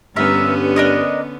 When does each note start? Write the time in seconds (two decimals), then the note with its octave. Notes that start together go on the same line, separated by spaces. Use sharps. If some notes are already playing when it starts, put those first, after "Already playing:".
0.16 G2 D3 B3 C#4 A#4 E5
0.76 D4 A#4 D#5